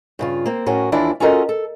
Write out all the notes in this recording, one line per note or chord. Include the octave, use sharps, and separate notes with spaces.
G2 C#3 F4
A#3 C4
F2 A2 C#4 F#4 A#4 G#5
D#2 E3 D4 E4 F4 D5
C#4 F4 F#4 A4 A#4 D#5
A4